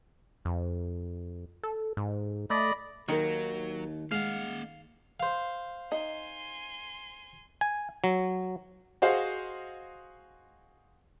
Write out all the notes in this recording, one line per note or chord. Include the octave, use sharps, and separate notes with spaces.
F2
A4
G#2
A3 D5 D#5 B5
D#2 D#3 F#3 D#4 A#4
G#3 A#3 F5 F#5
C5 F5
D#4 G#5 C6
G#5
F#3
F#4 G#4 C5 D#5 F5 F#5